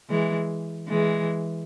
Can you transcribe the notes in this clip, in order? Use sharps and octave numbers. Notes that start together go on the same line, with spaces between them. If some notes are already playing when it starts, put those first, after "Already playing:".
E3 G#3
E3 G#3